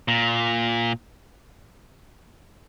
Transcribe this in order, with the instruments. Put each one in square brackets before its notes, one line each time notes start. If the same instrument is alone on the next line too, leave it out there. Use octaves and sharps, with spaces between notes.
[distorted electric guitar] A#2